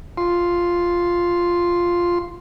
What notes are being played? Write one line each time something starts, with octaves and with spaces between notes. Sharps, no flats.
F4 C6